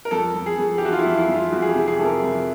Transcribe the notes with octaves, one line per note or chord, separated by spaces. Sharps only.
A#4
F2 A4
F2
G#4
F2
G4
E3 F#4
F4
E4
F2
E4
F2
F4
F2 F#4
G#4
G4
C3
G#4
C3 A4
A#4
F2